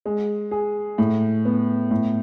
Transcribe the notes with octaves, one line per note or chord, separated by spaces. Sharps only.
G#3
G#4
A2
B3
A2